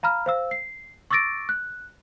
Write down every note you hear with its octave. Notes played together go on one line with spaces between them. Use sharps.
F5 A#5 B5 F6
C5 F5 E6
C7
C#6 D6 E6 A6 A#6 D7
F#6